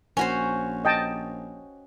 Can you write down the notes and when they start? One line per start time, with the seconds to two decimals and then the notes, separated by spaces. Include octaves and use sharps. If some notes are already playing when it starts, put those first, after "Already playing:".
0.17 A#1 C#4 F#4 C5
0.85 D#5 G5 A5